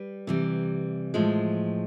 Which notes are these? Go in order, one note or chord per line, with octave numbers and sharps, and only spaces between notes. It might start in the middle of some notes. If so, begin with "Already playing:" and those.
Already playing: G3 B4
C3 E3 G3
A2 F3 G#3